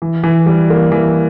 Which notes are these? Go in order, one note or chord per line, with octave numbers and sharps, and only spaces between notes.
E3
E3
G3
A#3
E3